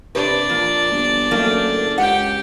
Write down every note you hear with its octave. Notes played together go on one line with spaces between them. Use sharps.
C3 D4 B4 D5
F2 A#2
G1
F#1 A3 A#3
C#2 G4 F#5 G5